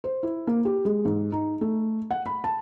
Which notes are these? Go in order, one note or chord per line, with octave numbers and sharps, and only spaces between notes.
C5
E4
A#3
G4
G#3
G#2
D#4
A3
F#5
B5
A5